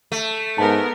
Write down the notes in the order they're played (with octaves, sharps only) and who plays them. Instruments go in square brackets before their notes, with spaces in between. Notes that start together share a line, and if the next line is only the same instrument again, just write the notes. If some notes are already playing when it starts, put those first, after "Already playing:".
[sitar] A3
[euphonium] G#2 [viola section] B3 A#4 [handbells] A5